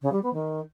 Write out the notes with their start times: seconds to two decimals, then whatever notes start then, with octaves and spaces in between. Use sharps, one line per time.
0.01 C#3
0.12 G3
0.22 B3
0.33 D#3